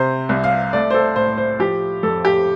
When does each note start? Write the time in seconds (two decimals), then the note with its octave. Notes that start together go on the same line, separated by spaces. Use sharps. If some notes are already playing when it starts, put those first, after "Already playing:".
Already playing: C3 C5
0.29 C2
0.44 F5
0.73 A3 D5
0.91 C5
0.94 A4
1.16 A2 C5
1.38 C5
1.60 F3 G4
2.03 F2 A4
2.25 G4